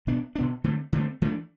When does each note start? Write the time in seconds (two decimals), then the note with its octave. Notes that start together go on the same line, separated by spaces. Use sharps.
0.07 B2 B3 D4
0.35 B2 B3 D4
0.64 D3 A3 C4
0.93 D3 A3 C4
1.22 E3 A3 D4